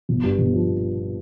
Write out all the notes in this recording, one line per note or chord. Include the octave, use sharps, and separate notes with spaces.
G1
G2
G1
F3